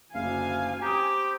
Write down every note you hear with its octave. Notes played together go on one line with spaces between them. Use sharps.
F#1 D2 F5 G#5
C4 G4 G5 A#5 D#6